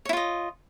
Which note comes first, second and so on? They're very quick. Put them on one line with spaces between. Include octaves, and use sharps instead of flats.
C#5 E4 F4 D#5